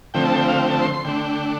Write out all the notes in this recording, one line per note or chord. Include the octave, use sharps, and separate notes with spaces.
D3 F3 A3 C4 G5
A5
G5
F5
G5
A5
C6
C6
D3 A3 D4 G5